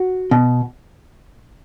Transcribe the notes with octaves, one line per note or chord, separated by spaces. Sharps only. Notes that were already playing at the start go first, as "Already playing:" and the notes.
Already playing: F#4
B2